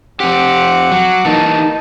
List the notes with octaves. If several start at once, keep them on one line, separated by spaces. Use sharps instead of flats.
F2 C4 G4 F#5 D6
F#3
E3 A#3 D#4 A5